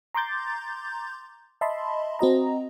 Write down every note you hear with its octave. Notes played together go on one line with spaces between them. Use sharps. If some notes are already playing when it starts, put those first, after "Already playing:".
A#5 C6 D6 G6 A6
D#5 E5 A5 B5 C6
C4 F#4 D#5 A#5